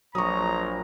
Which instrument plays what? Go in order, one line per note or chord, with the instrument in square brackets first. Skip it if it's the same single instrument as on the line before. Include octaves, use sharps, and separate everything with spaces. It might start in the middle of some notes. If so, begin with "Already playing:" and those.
[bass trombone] A#1 [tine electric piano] F#3 [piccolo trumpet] A#5 [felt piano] C#6 D#6